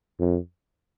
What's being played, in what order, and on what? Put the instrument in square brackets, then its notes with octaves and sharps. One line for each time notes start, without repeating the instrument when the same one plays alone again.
[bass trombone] F2